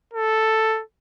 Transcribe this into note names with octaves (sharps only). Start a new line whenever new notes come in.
A4